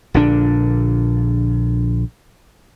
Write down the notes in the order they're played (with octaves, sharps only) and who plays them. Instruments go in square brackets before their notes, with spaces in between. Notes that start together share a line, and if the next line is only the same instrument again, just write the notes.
[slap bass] A#1 A#2 D3 D4